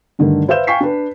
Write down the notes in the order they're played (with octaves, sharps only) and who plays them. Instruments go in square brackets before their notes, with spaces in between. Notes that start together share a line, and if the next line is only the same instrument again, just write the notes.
[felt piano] G2 D3 D#3 A3
B4 C5 E5 F5 G6 E7
F5 G5 G#5 C#6 B6 C7
D4 B4